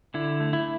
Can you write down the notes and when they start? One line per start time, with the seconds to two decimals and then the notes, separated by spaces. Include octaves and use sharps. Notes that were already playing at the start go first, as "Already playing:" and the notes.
0.14 D3 E4
0.40 A3
0.53 E4